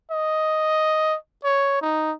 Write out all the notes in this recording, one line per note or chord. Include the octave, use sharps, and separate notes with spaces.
D#5
C#5
D#4